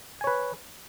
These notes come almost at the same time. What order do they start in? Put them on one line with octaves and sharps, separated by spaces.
G#5 C#5 B4